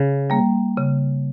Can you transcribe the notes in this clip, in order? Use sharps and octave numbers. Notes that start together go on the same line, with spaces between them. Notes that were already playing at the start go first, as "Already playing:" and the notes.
Already playing: C#3
G3 A#3
C#3